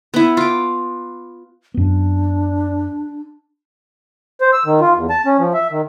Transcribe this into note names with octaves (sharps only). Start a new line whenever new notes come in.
B3 E4
F4 D6
F#2 B3 D4
C5
E6
D#3
F4
E2
A5
C#4
F3
E5
D#3